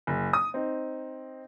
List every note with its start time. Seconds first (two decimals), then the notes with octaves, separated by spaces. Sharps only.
0.07 F#1
0.33 D#6
0.54 C4 D#4